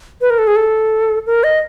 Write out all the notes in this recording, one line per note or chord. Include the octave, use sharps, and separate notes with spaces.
B4
A#4
A4
G#4
A4
A#4
D#5